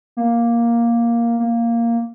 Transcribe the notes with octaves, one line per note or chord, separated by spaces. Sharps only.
A#3
A#3